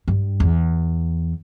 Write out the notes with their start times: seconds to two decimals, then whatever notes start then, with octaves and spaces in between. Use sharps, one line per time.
0.08 G2
0.40 E2